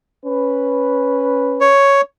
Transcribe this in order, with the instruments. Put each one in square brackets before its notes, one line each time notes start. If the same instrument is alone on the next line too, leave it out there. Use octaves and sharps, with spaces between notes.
[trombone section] C#4 B4
[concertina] C#5